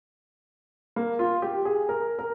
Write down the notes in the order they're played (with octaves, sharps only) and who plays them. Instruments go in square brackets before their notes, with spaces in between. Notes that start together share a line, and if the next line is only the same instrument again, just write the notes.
[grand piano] A#3
F4
G4
G#4
A#4
A#4